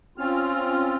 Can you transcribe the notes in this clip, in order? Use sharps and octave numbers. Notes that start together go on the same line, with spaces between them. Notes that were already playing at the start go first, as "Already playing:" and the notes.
C4 C#4 F4 F6